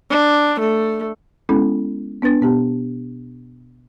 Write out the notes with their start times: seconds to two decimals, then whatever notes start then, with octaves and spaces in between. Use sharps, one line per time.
0.10 D4
0.59 A3
1.49 G#3 B3 C#4 E4 A4
2.22 B3 D4 B4 A6
2.41 B2 B3 G4 A5